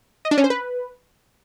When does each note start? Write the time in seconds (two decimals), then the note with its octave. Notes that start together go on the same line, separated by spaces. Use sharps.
0.25 D#5
0.31 D4
0.38 C#4
0.44 C5
0.50 B4